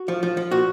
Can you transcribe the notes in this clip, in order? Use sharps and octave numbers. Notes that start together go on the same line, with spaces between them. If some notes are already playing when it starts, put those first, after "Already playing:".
Already playing: F#4
F3
F3
F3
A#2 F#4